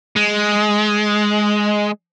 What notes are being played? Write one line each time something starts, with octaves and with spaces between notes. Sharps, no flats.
G#3